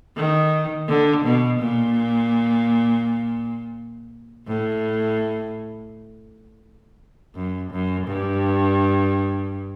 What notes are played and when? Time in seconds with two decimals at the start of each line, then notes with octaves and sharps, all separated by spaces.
0.17 D#3
0.88 D3
1.25 B2
1.60 A#2
4.48 A2
7.36 F#2
7.72 F#2
8.07 G2